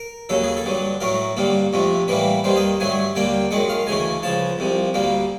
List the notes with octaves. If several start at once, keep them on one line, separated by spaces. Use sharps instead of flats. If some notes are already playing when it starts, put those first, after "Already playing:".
Already playing: A#4
D#2 C#3 F#3 A4
G#4
A4
G2 D3 F#3
A2 F#3 A3 A#4
G2 D3 G3 A#3
F2 C3 F3 A3
A2 E3 G3 A#3 B4
D#2 D#3 G3 A#3 C5
D#5
G2 D3 F#3 A3 G#5
D#2 D3 G3 A#3 G5
F#2 D#3 G#3 F#5
F5
D2 C#3 E3 A3 G#5
C#2 C#3 F3 A5
C2 C3 F3
D2 D3 G3 A#3